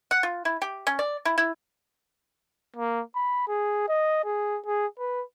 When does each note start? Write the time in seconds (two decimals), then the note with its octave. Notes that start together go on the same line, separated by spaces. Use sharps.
0.11 F#5
0.23 F4
0.45 E4
0.62 G4
0.87 C#4
0.99 D5
1.25 E4
1.38 E4
2.76 A#3
3.15 B5
3.48 G#4
3.89 D#5
4.24 G#4
4.66 G#4
4.99 B4